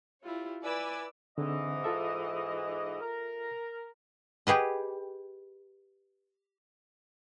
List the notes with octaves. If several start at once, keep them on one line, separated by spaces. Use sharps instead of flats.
E4 F4 G4 C#5
E4 B4 D5 G#5 D6 E6
G#2 D3 E3 C4 D#5
F4 A4 E5
A#4
G4 G#4 B4 D#5